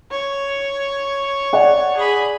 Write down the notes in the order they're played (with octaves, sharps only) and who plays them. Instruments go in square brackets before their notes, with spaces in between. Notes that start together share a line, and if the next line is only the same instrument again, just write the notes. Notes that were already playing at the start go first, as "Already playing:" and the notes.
[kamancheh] C#5
[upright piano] D5 F#5
[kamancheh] G#4 B5